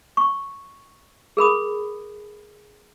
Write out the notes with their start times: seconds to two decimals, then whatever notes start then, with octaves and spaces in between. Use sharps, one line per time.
0.17 C#6
1.37 G#4 A#4 B5 D#6